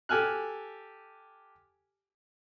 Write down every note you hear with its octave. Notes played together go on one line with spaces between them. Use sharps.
G4 A4 G#5 F6 F#6